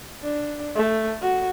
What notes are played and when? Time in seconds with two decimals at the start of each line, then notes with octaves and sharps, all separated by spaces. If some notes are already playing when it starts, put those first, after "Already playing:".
0.23 D4
0.75 A3
1.21 F#4